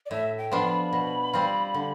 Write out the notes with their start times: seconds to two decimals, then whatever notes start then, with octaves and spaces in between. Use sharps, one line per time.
0.06 D5
0.11 A2 E5
0.38 G5
0.51 F3 B3 D4 F4
0.65 B5
0.93 B2
1.33 G3 C4 F4
1.74 D3